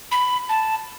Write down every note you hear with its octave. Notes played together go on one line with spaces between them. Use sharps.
B5
A5